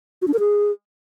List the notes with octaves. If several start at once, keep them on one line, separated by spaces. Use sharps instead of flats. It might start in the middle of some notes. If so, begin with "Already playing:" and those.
F#4
D4
A#4
G#4